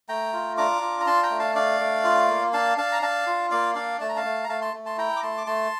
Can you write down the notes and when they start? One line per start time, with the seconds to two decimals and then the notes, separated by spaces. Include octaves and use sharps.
0.09 A3 G5 A#5
0.33 F4
0.57 D4 A#5 D6
0.82 F4
1.00 A#5
1.07 D4 A5 C6
1.23 G5 A#5
1.30 A3
1.39 F5 A5
1.55 D4 D5 F5
1.81 A3
2.04 F4
2.29 A#3
2.53 D4 F5 A5
2.78 D4 F5 A5
2.92 A#5
3.02 D4 F5 A5
3.27 F4
3.51 A#3 D5 F5
3.75 D4 D5 F5
4.00 A3 A5
4.09 A#5
4.16 F5 A5
4.25 A3
4.44 A#5
4.49 A3 F5 A5
4.62 A5 C6
4.74 A3
4.86 A5 C6
4.97 E4 G5 A#5
5.17 D6
5.23 A3 A5 C6
5.38 D6
5.47 A3 A5 C6